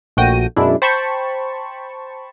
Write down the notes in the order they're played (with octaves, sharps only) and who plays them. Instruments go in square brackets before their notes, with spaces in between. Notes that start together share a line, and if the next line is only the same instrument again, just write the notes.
[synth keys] A#1 A3 F#4 G5 A#6 D#7
F#2 B2 G#3 D4 E4
C5 G5 A5 B5 C#6